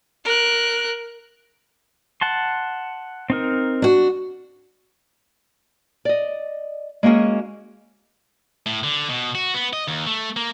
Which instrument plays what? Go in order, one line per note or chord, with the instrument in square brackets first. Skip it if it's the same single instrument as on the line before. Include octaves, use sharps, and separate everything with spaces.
[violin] A#4 F#6
[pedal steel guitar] F#5 A5 C6
C4 D#4 A#4
[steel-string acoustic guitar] D4 F#4
[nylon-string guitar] D5 D#5
G#3 A#3 C#4 F#4 G#4
[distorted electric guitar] A2
D3
B2
F#4
B3
D#5
D#2
A3
A#3